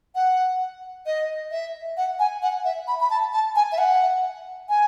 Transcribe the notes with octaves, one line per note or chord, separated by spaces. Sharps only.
F#5
D#5
E5
F#5
G#5
F#5
E5
B5
B5
A5
A5
G#5
E5
F#5
G#5